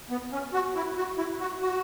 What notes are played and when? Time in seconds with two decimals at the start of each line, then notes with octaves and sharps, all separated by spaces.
0.10 B3
0.32 C#4
0.53 F#4
0.75 E4
0.97 F#4
1.18 E4
1.40 F#4
1.61 F#4